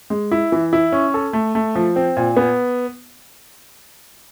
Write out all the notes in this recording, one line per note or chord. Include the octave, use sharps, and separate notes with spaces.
G#3
E4
E3
E4
C#4
A4
A3
A3
F3
C4
A#2
B3